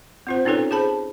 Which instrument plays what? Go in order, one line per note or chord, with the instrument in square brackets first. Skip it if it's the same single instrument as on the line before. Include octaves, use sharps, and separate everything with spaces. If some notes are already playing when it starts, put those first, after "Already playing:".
[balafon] C4 F4 C5
C#4 D#4 F4 A4 B4 C#5
G#4 C5 A5 B5